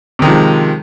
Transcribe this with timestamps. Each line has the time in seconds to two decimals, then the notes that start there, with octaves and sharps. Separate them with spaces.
0.19 C3
0.22 D#3
0.25 G#3
0.28 F3